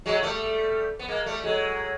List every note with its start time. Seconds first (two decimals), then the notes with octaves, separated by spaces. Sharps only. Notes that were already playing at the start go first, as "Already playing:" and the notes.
0.06 F#3 G#3
0.23 G3 A3
0.99 B3
1.08 G#3 A#3
1.26 G3 A3
1.43 F#3 G#3